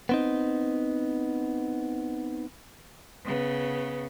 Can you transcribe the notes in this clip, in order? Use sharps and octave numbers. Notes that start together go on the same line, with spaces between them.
B3 C4 D#4
C#3 B3